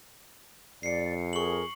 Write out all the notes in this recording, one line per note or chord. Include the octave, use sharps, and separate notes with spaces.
F2 D5 C7 C#7
G#4 A#4 C#6 F#7